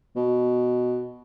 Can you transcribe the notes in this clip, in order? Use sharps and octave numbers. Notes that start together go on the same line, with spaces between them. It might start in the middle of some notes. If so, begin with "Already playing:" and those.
B2